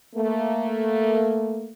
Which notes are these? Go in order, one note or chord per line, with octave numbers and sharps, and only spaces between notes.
A3 A#3